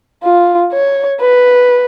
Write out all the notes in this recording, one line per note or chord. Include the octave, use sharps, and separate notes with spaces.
F4
C#5
B4